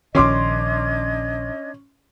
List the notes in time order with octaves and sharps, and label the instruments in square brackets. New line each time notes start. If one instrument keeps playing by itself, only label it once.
[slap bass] A#1 D#3 [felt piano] C#4 C6 D6 [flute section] D4 D#5 G#6